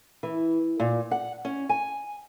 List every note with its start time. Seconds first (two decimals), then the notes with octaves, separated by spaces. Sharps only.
0.23 E3
0.80 A#2
1.11 F#5
1.45 C#4
1.69 G#5